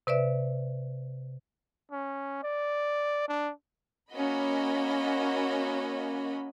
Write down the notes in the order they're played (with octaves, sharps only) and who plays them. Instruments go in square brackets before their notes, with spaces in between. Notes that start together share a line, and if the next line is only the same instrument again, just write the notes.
[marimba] C3 B4 D5 E5
[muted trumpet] C#4
D5
D4
[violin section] A#3 C#4 F#4 D#5 B5